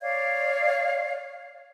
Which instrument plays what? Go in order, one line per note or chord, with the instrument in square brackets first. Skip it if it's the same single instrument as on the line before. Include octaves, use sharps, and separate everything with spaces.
[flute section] C#5 D5 F5 G#6